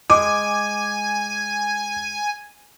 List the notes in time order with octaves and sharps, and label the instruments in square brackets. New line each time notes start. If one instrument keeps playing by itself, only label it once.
[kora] G#3 G5 [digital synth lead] G#5 [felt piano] D6